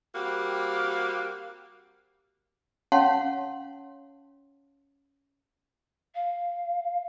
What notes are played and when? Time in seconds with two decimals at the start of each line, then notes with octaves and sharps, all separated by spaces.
0.15 G3 A#3 C4 F#4 G4
2.92 C#4 C#5 F5 F#5 A5 C6
6.15 F5